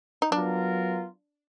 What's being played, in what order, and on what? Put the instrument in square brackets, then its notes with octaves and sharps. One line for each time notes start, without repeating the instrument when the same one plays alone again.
[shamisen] D#4
[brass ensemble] F#3 B3 F4 A#4 [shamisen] D4